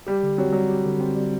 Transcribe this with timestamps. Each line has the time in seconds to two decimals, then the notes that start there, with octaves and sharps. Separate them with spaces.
0.07 G3 G4
0.23 D3
0.38 F#3 C4
0.53 F#3 G3
0.70 G4
0.86 D3
1.01 C4
1.16 G3